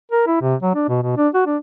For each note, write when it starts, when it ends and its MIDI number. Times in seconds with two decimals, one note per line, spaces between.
0.12 0.24 70
0.27 0.37 64
0.41 0.55 48
0.63 0.74 54
0.75 0.86 62
0.89 1.00 47
1.03 1.16 47
1.17 1.29 62
1.34 1.42 66
1.46 1.57 62